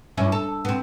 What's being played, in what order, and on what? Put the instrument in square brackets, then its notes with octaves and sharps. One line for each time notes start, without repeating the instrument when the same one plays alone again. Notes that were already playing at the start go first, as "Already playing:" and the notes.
[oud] G2 C#4 E4
A4
B3 C4